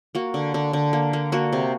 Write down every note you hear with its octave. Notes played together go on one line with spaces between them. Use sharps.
A#3 F#4
D3
D3
D3
A#3
A#3
A#3 F#4
C3